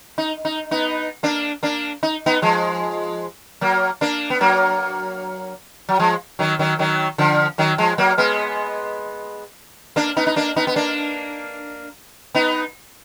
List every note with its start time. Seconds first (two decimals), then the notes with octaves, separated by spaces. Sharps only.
0.18 D#4
0.45 D#4
0.71 B3 D#4
1.23 A#3 D4
1.63 A#3 D4
2.03 D#4
2.26 B3 D#4
2.42 F3 G#3
3.61 F#3 A#3
4.01 A#3 D4
4.30 B3
4.41 F#3 A#3
5.89 F#3
6.00 F3 G#3
6.39 D#3 F#3
6.59 D#3 F#3
6.79 D#3 F#3
7.18 D3 F3
7.58 D#3 F#3
7.78 F3 G#3
7.98 F#3 A#3
8.18 G#3 B3
9.96 A#3 D4
10.16 B3 D#4
10.27 D#4
10.36 A#3 D4
10.56 B3 D#4
10.67 B3
10.76 A#3 D4
12.35 B3 D#4